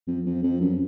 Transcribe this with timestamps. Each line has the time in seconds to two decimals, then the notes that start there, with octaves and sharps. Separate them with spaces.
0.07 F2
0.26 F2
0.43 F2
0.61 F#2